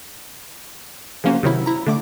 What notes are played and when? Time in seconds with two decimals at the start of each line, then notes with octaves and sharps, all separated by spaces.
1.24 C#3 F3 A#3 C#4 F#4 C5
1.43 C3 D#3 F#3 E4
1.66 E4 A#5
1.87 D3 A3 D6